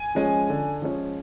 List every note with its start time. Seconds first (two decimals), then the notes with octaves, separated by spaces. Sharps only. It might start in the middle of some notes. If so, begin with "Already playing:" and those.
Already playing: G#5
0.15 F3 G#3 C#4
0.49 D3
0.82 F3 G#3 C#4